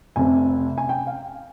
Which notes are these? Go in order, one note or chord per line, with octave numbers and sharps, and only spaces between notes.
F1 F2 C3 G#5
G#5
G5
F5